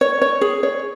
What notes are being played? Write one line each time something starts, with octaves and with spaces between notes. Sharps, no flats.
C#5
C#5
G#4
C#5